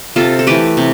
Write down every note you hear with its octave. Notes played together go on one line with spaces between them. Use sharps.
C3 F4 A4
A4
E3 A3 G4 B4
C3